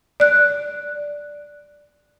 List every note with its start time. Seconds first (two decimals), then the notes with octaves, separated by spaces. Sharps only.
0.20 D5 F#6